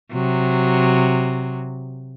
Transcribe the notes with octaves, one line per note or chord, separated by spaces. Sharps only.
C3 F#3